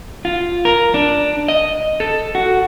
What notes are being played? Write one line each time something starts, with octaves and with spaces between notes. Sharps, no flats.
F4
A#4
D4
D#5
A4
F#4